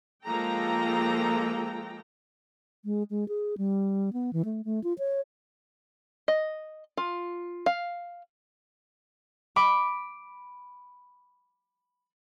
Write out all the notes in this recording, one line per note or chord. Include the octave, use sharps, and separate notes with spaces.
F3 G#3 A#3 A4 G5 A#5
G#3
G#3
G#4
G3
B3
E3
A3
A3
F4
C#5
D#5
F4
F5
B5 D6